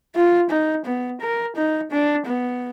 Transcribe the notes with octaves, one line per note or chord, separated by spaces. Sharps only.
F4
D#4
B3
A#4
D#4
D4
B3